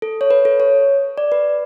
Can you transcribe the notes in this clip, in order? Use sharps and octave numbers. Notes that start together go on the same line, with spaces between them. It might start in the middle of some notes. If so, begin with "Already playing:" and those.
A4
C#5
B4
A4
C#5
D5
B4